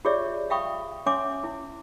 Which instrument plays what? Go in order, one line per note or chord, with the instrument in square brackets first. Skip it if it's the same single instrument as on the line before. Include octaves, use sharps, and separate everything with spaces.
[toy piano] F4 G4 G#4 C#5 D5 E5
E5 F5 G5 B5 C#6 D#6
C#4 C#5 E5 G#5 C6 D6
E4